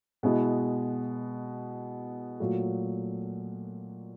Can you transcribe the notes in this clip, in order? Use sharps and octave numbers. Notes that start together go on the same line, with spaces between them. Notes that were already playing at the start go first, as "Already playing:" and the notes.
B2 G#3 B3 E4
A#2 F#3 A3